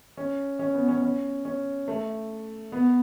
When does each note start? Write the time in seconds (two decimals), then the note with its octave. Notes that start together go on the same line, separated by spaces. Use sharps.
0.17 C#4
0.59 C#4
0.74 B3
0.88 C#4
1.02 C#4
1.45 C#4
1.88 A3
2.72 B3